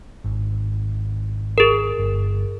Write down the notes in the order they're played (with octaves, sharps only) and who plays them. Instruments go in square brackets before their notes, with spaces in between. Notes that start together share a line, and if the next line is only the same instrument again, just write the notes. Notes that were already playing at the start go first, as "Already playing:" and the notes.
[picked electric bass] G#1
[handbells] G#4 A#4
[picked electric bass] G1